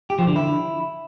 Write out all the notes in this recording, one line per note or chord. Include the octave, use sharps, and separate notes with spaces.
G4
F3
D3
E4